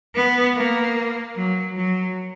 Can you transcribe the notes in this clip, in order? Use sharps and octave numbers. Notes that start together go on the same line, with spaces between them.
B3
A#3
F#3
F#3